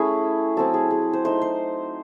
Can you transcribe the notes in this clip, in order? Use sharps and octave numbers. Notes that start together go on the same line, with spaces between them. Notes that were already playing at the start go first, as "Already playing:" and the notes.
Already playing: A3 C#4 E4 G#4
F#3 C4 E4 A4
G#4
G#4
C5
A3 D#4 C5
C5